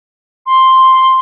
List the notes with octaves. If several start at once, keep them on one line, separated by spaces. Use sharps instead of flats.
C6